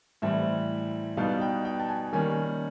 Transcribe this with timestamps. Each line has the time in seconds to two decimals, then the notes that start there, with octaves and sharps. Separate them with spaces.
0.22 A2 E3 G3 C4 E5
1.17 B2 G3 B3 D#4 F5
1.41 G5
1.65 G5
1.80 A5
1.89 G#5
2.13 D#3 G3 A#3 C#4 G#5